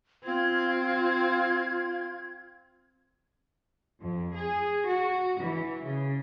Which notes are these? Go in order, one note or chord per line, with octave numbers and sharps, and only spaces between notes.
C4 F4 G#6
F2
G#4
F#4
E3
C#3